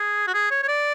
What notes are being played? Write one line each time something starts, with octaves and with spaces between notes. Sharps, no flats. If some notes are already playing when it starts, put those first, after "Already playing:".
Already playing: G#4
F#4
G#4
C#5
C#5
D5